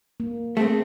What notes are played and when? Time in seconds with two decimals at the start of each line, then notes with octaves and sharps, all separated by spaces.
0.20 A#3
0.57 A3 C4 G#4